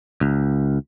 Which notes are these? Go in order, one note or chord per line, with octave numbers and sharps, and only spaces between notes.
C#2